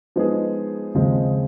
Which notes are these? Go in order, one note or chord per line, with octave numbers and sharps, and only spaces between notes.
F3 G#3 B3 D#4 G#4
D#2 C#3 F3 G#3 C4